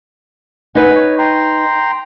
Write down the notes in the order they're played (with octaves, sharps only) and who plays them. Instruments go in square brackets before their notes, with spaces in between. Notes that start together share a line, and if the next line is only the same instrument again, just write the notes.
[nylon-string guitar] D#4 B4 [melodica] F#5 G#5
[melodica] C#5
G5 A#5 C6